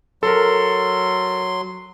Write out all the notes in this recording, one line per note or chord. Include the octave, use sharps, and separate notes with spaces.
F#3 A4 A#4 C6